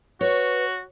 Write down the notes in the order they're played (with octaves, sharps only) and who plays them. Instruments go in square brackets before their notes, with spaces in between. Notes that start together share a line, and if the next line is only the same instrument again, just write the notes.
[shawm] F#4 [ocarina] B4 [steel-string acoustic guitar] C#5